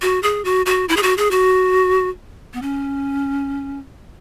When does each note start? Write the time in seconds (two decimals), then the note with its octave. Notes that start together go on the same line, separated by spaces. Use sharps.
0.02 F#4
0.23 G#4
0.45 F#4
0.66 F#4
0.89 E4
0.97 G#4
1.03 F#4
1.18 G#4
1.31 F#4
2.53 B3
2.62 C#4